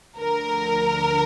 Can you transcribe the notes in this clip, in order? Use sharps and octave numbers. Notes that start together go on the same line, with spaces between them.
D2 D3 F3 A#4